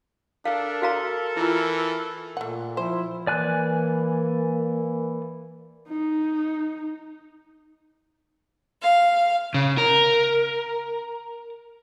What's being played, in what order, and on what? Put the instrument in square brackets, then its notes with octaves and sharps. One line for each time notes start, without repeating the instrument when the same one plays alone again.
[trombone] D4 [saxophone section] A4 A#4 [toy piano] F5
[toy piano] F#4 F5 A#5
[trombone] E3 [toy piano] E4 F4
[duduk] A#2 [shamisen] A3 F#5
[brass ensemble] F3 E4 [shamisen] C5
[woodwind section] E3 [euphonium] A#3 [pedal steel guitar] D5 G#5 F#6
[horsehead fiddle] D#4
[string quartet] F5
[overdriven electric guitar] C#3
A#4